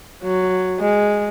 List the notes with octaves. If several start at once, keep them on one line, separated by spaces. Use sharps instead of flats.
F#3
G#3